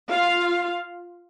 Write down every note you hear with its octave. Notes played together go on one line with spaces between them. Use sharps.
F4 F5